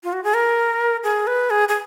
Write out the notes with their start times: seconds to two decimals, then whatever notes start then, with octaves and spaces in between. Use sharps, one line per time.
0.04 F4
0.13 F#4
0.24 G#4
0.34 A#4
1.04 G#4
1.27 B4
1.50 G#4
1.69 G#4